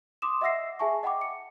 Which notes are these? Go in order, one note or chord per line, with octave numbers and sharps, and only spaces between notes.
C6 D6 D#6 E7
D#5 E5 F#5 E6 A#6 C7
G#4 E5 G#5 A5 C#6
D#5 F#5 G5 B5 D6
C#7